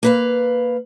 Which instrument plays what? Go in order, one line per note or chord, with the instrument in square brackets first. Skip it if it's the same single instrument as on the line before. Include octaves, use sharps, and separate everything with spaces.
[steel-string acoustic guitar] A#3 B4 F5